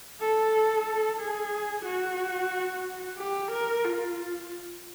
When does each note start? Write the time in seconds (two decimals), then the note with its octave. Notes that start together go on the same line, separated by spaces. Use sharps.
0.20 A4
1.20 G#4
1.85 F#4
3.18 G4
3.52 A#4
3.84 F4